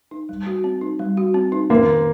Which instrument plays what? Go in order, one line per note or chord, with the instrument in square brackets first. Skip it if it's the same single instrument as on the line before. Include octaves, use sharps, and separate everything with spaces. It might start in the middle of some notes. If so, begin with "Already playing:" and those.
[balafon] D#4
G3
F#4
C4
D#4
G3
F#4
C4
D#4
[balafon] D#3 [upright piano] A#3
[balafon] D#3